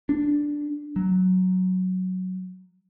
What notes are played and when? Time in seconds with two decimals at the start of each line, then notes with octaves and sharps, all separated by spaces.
0.09 D4
0.96 F#3